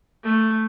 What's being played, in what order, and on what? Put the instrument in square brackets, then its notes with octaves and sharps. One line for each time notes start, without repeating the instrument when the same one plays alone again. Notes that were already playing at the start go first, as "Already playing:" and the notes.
[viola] A3